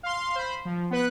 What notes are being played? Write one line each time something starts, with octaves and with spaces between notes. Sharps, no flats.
F5 C6
C5 B5
F3
B3 B4 F#6